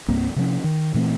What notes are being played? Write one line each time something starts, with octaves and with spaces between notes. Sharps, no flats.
C2 G2 A#3 C4
C3 F3 C#4
D#3
A#2 E3 A3 C4